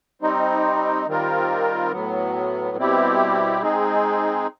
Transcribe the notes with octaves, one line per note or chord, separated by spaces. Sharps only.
G3 C4 D#4
D#3 G3 C4 F4 A#4
A2 F#3 B3
B2 G3 C4 E4 G4
G#3 C4 D#4 G#4